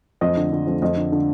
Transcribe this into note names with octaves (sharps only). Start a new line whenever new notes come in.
F2 D#5
D3
D3
F2
F2 D#5
D3
D3